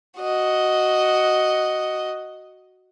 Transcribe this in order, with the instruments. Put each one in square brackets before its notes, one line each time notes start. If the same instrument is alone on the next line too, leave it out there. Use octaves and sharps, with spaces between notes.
[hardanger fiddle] F#4 D#5